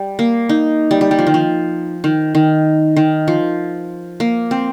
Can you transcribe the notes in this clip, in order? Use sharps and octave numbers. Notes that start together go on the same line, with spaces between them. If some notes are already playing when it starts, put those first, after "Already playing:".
Already playing: G3
A#3
D#4
G3
G3
G3
F3
D#3
F3
D#3
D#3
D#3
F3
A#3
C4